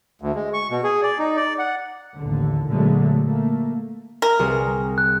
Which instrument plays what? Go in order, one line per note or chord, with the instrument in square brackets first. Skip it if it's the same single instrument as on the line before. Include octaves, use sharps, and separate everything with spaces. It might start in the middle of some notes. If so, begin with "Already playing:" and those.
[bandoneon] D2
G#3
C#6
B2
G#4
D5
D#4
D5
F#5
[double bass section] A1 D#2 D3
A#2 D3 F#3 G#3 A3 B3
A3 A#3
[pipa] A#4
[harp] C2 G#4
[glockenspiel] F#6